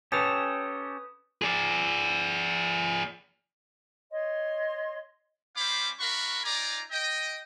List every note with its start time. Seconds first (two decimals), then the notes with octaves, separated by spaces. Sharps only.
0.12 C#4 G4 A4 B4 D#6
1.42 G#4 D5
4.10 C#5 D#5 C6
5.57 G3 C#4 C5 F5 B5 D6
6.00 D4 F#4 A#4 F5 B5 C#6
6.44 D#4 F4 D5 G#5 A#5 D6
6.91 D#5 G5